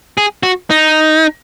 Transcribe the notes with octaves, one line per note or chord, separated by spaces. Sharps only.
G#4
F#4
D#4